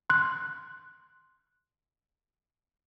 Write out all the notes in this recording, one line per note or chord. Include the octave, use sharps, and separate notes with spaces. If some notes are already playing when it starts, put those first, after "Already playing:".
C6 F#6